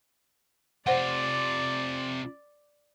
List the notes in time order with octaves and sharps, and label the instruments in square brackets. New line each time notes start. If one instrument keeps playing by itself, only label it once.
[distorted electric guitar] C3 F4 [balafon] C5 F#5 [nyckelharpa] D5